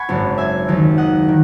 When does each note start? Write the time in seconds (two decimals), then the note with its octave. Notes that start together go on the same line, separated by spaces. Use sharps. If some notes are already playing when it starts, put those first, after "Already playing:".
Already playing: F#5 G#5 B5 C#6
0.09 G#1 F#2 C#3
0.38 E5 G#5
0.68 D#2 D#3 F#3
0.98 D#5 F#5
1.29 D#3